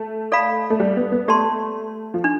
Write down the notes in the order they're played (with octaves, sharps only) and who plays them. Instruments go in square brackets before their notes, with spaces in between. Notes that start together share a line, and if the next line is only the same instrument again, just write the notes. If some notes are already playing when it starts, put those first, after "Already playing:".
Already playing: [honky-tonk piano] A3
[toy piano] A4 D5 F5 B5
[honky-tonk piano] A3
G3
B3
B3
[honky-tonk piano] A3 [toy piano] G4 D5 A5 C6
[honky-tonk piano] F3
[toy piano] D4